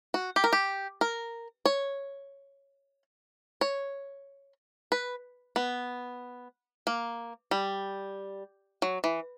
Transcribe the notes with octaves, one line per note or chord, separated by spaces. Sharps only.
F#4
G4
A#4
G4
A#4
C#5
C#5
B4
B3
A#3
G3
F#3
E3